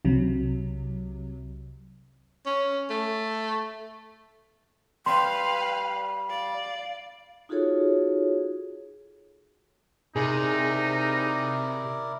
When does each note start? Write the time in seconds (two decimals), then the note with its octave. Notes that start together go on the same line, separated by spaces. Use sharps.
0.05 C2 C3 F#3
2.46 C#4
2.90 A3
5.06 G3 B4 F5 G5 C6
6.30 D5 F5
7.49 D#4 F4 F#4 G#4 A4 C#5
10.16 C3 D#4 E4 G#4 A#4 D5